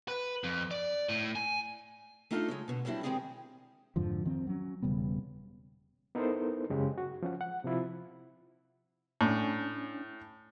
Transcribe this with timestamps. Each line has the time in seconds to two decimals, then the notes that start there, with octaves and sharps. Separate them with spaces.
0.08 B4
0.44 F2
0.71 D5
1.09 A2
1.36 G#5
2.31 A3 D4 D#4 F4 G#4 A4
2.48 C#3 F#3 G#3
2.68 B2 D3
2.85 F#3 G3 C4 D4 E4
3.03 D#3 G#3 C4 G4 G#4 D5
3.96 F2 G#2 D3 F3
4.25 D#3 F3 C4
4.47 F#3 C#4
4.82 E1 C#3 G3 B3
6.15 B3 D#4 E4 A4 A#4 C5
6.70 F#2 C#3 G#3 G4
6.98 F#4
7.23 F3 C#4 F#5
7.41 F#5
7.64 C3 F3 E4 F4
9.21 A2 C#4 D4 G#5